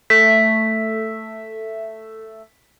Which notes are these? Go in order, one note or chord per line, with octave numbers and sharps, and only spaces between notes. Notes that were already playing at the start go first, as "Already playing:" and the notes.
A3 E5 B6